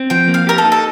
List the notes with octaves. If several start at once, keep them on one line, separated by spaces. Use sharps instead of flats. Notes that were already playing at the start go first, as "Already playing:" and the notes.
Already playing: C4
F3 G5
A#3
F5
G4 A#4
A4
D#4
A4